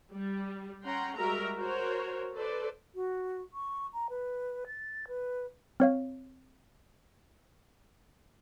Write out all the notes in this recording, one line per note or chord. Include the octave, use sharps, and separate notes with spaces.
G3
C#4 F#5 G5 A#5 C6
G3 G#3 F#4 A#4 E5 A#5
F#4 A#4 C5 C#5
A4 B4 C5 D5
F#4
C#6
A#5
B4
A6
B4
C4 C#5 F5